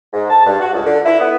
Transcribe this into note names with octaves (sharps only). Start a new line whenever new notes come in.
G#2
A5
G2
F#4
C#2
D3
E4
B3